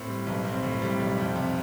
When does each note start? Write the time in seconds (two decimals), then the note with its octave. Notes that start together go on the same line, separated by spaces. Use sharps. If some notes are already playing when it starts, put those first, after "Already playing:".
Already playing: A2 C4
0.08 G3
0.27 B1
0.45 C4
0.63 A2
0.82 G3
1.00 B1
1.18 F2
1.36 C3